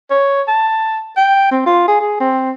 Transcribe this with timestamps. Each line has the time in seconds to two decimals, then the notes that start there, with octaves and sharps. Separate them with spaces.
0.11 C#5
0.48 A5
1.17 G5
1.51 C4
1.66 F4
1.88 G#4
2.01 G#4
2.20 C4